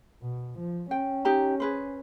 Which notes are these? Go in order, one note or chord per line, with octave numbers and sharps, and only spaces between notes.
B2
F3
C#4 G5
D#4 G4 A#5
G#4 B4 C5